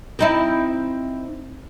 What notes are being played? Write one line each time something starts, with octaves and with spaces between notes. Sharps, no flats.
C4 D#4 E4